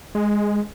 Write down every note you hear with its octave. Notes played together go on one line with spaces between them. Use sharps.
G#3